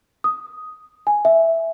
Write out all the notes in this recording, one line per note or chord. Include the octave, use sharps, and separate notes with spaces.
D#6
G#5
E5